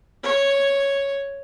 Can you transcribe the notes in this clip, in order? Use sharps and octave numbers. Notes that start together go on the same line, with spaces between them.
C#5